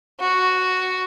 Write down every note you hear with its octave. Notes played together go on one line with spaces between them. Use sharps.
F#4